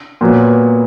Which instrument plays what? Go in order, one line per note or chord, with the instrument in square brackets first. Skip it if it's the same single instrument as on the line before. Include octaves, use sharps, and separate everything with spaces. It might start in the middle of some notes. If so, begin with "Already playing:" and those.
[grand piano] A#2 F#3 B3